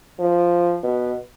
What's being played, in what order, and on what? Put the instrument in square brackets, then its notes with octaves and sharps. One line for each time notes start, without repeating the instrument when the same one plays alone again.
[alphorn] F3
B2